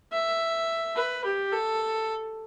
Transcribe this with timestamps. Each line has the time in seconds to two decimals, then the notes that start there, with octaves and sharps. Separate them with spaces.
0.12 E5
0.96 B4
1.24 G4
1.52 A4